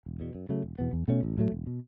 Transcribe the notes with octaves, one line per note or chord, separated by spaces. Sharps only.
E1
E2 B2
F#2
C#3 F#3 A3
E1
E2 B2 B3
E2
B2 A3 C#4
A1
A2 F#3 A3
E1
B2